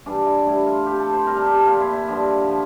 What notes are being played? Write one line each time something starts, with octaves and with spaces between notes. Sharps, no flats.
G2 E3 G3 D4
E4
A2 G3 E4
F4
C3 F3 G4
A4
C5
C3 G3 A#4
A4
G4
A4
A#2 F3 F4
E4
E4
G2 D3 F3
F3